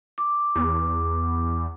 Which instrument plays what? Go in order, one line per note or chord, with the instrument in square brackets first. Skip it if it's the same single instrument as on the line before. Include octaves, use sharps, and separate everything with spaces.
[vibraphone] D6
[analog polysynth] E2